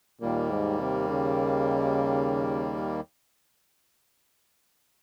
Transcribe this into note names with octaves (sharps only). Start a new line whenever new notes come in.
D#2 A#2 D#3 G3 A#3
G#2
C3
C#3